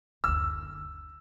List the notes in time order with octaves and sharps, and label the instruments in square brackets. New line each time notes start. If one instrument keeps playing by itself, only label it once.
[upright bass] F#1 D2 [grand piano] E6